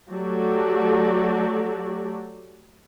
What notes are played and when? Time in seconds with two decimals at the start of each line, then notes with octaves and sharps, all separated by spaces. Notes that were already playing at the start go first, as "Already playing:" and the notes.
0.12 F#3 A3 F#4 G4 A4 D5